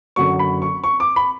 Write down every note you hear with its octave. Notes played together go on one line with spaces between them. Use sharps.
F#1 F#2 D3 F#3 C#6
B5
C#6
C#6
D6
B5